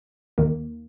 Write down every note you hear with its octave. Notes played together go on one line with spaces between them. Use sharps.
D#2 D#3 A#3